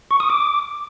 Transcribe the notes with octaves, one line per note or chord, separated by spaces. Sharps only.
C#6
D#6
D6